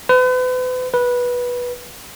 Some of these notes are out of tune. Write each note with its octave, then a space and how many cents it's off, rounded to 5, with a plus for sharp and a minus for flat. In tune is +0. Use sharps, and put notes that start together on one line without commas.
B4 +40
B4 -15